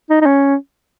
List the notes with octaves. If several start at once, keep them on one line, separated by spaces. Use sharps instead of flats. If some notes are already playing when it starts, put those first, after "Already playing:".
D#4
D#4
C#4